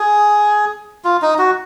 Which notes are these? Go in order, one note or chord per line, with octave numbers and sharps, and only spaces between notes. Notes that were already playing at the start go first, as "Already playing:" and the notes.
Already playing: G#4
F4
D#4
F#4